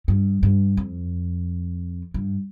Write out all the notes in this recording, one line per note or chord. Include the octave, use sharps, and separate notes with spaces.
G2
G2
F2
G2